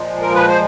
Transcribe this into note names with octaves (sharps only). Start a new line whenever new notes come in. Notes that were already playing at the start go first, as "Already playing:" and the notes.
Already playing: A#2 F3 G#3
A#4
B4
C5